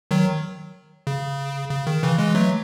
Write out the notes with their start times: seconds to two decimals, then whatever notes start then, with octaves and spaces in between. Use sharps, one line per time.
0.11 D#3 F#3
1.07 C#3
1.71 C#3
1.87 D#3
2.03 C#3 E3
2.18 E3 G#3
2.35 F#3 A3